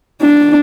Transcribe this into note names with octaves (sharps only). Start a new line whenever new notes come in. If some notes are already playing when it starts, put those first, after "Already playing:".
D4